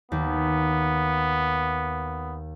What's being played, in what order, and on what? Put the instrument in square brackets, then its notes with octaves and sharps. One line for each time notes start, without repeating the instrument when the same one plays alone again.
[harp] D#2 [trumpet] B3